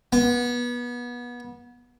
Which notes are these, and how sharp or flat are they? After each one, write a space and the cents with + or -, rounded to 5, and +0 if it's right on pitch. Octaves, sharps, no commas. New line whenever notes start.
B3 -25